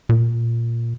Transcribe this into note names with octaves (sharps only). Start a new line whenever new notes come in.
A#2